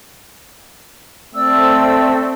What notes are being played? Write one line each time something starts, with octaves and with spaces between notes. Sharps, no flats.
A3 C4 D5 E6